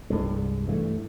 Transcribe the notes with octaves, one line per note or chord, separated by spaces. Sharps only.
C2 G2 G#3
G2 E3 A3